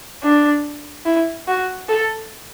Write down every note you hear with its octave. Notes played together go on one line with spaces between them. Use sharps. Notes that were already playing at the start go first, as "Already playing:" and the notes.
D4
E4
F#4
A4